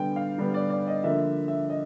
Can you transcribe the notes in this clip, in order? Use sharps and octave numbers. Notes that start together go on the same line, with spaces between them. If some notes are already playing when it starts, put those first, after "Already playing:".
Already playing: D3 G3 B3 G5
F5
D3 G3 B3
D5
D5
D#5
D3 F3 A#3 E5
E5
D#5